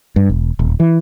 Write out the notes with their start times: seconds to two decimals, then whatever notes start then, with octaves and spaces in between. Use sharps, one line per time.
0.16 G2
0.29 E1
0.59 D#1
0.80 E3